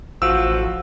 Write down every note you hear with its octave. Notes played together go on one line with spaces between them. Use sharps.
A1 F3 F#4 E6